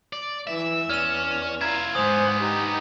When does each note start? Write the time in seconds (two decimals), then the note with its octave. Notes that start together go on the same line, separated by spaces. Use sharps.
0.13 D5
0.47 E3 E5 E6
0.90 E2 C#4 D5 F6 E7
1.61 E4 F4 A#5 G#6
1.95 G#2 D3 B3 C5 G#5 D#6 F#6
2.39 D#4 G4